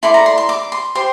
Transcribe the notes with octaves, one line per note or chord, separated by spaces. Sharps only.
E4 A4 D5 C6
A#5
C6
C6
D6
C6
G4 C5 C6